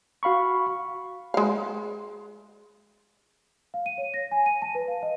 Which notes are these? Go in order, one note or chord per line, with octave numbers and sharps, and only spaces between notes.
F#4 F5 B5 C#6
G#3 F5
F5
D#7
C#5
A#6
G#5
D#7
A5
B4
F5
D#5